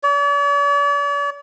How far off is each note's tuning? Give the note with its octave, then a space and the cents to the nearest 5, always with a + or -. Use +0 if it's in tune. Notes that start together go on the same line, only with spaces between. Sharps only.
D5 -45